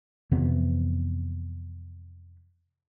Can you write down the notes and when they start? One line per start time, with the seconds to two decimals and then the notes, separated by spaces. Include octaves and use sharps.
0.31 F2 C3 E3 B3